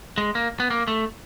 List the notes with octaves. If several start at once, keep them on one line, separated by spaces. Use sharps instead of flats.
G#3
A#3
B3
A#3
A3